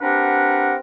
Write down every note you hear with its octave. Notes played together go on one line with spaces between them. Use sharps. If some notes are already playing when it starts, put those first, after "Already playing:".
C4 D4 G4 A#4 B4 F#5